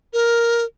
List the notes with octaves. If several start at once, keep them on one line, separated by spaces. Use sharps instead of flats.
A#4